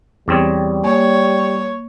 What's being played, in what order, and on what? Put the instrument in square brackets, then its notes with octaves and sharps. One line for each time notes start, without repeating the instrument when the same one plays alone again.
[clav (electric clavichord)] E2 C4 C#5 [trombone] G3
[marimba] A#3 [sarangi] C#5 [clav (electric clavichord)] G#5